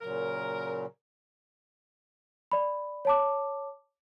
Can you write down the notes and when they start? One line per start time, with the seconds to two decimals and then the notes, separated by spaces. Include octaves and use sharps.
0.01 A#2 C#3 F#3 A#4
2.52 D5 B5
3.05 C#5 A5 D6